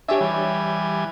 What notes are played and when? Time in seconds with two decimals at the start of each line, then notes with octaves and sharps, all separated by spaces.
0.09 D4 G4 C#5 E5 G#5
0.21 E3 G3 G#5